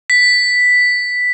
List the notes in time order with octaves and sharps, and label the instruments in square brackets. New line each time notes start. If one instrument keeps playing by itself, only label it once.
[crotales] B6